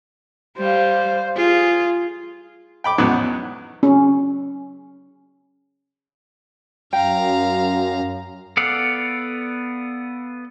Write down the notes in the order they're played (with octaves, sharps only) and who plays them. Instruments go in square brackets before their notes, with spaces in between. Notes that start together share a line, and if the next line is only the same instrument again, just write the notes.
[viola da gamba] G3 [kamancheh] C5 F5
[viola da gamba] F4 [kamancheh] G#4
[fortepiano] G5 B5 D6
E2 G#2 F#3 B3 C#4
[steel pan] C#4
[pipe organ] F#2 [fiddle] F5 A#5 [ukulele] G5
[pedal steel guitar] B3 A4 D5 F5 F#5